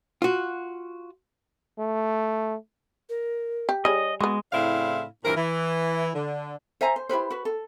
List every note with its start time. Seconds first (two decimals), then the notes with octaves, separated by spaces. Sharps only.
0.22 F4 F#4
1.79 A3
3.09 A#4
3.69 G4
3.85 G3 G#4 C#5 D#5
4.21 G#3 B3 F#4 D#6
4.52 A2 C#3 C4 D4 E4 F5
5.24 G2 A#2 E3 C4 A#4
5.36 E3
6.15 D3
6.81 C5 E5 G#5 A#5
6.96 C5
7.09 E4 G4 B4 C5
7.30 F#4 B4
7.45 A4